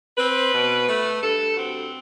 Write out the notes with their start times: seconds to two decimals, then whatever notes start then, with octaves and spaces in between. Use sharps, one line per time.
0.18 C4 B4
0.52 B2
0.88 A3
1.22 G2 A4
1.56 C4 F#4